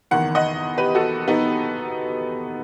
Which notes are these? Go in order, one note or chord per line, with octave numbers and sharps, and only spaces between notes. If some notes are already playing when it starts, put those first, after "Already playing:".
F#1 E2 D#3 F#5
D#5 F#5
G4 B4
F#4 A4
B3 D#4